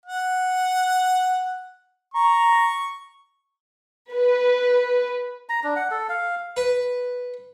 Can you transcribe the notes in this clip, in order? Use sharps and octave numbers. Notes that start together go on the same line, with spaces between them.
F#5
A#5 C#6
B4
A#5
D4
F#5
A4
F5
B4